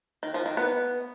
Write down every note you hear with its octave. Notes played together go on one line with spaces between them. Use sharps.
D#3
F3
D#3
B3